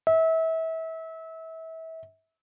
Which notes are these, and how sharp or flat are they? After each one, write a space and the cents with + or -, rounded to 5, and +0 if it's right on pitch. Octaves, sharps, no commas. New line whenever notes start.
E5 -30